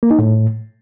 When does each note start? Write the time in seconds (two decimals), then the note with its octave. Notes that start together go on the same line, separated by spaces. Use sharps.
0.03 A#3
0.11 D#4
0.19 A2